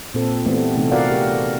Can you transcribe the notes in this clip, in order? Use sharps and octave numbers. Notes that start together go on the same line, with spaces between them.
A#2 C4 A4
E3 G3 A3 B3 C4
C3 E3 A3 D#4 A4
F4 F#4 A#4 D5 F5 F#5
G4 A#4